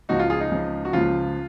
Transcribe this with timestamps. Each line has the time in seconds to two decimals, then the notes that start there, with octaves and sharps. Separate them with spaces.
0.09 C#2 C#3 F3 D#4 F#4
0.19 F4
0.30 F4 G#4
0.40 D#4
0.52 C#2 C#3 F3
0.85 F#4
0.93 C#2 C#3 F3 F4